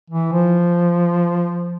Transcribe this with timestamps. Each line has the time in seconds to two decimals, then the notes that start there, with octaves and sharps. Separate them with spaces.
0.10 E3
0.32 F3